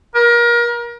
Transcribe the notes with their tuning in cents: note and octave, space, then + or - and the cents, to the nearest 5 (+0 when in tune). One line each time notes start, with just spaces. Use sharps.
A#4 +30